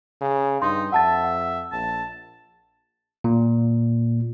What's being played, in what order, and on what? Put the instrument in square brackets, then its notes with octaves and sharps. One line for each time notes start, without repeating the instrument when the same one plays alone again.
[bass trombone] C#3
[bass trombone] G2 [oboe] D#4 [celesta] C6
[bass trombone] F2 [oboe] E5 [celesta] F#5 A5 A6
[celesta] F#5
[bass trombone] A#1 [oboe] A5
[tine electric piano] A#2